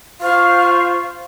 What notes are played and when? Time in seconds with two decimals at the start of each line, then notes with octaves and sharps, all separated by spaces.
0.21 F4 C5 F5 C#6